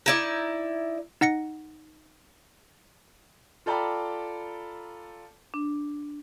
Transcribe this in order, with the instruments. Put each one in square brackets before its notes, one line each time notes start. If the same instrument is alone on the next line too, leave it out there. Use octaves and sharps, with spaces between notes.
[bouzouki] D#4 E4 D5
[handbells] D#4 F#5 A#6 C#7
[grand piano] F4 A4 D5 G5 A#5 B5
[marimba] D4